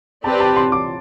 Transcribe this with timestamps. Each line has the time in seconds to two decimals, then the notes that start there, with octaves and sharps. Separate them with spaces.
0.24 C4 G4 B4 D5 A5
0.40 A5
0.56 C6
0.72 D6